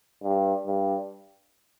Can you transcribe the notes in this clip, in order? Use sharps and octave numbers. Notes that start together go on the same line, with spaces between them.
G2
G2